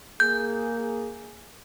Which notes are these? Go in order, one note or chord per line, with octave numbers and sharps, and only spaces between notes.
A#3 G#4 G6